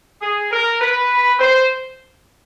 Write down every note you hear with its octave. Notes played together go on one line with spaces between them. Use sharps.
G#4
A#4
B4
C5